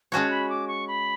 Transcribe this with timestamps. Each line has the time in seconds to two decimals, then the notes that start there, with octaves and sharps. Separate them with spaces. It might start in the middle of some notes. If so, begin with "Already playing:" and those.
0.12 G#3 C#4 F#4 C#5 A5
0.30 B5
0.49 D6
0.68 C#6
0.88 B5